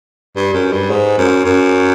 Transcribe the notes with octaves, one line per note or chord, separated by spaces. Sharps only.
G2
F#2
G2
G#2
F#2
F#2